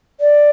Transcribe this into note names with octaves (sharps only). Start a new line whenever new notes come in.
D5